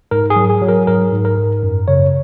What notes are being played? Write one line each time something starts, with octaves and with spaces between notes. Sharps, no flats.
G#2 A#4
G#4
F#3
G#4
F#3
A#4
G#2 A#4
G#2
A#4
G#2
F#2
C#3 C#5